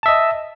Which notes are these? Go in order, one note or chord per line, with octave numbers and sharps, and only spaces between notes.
D#5 E5 A5